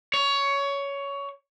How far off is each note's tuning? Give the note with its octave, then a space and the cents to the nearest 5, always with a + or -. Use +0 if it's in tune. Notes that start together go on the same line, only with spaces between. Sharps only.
C#5 +15